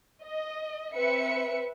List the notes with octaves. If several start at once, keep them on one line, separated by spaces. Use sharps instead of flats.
D#5
C4 B4 E5 C#7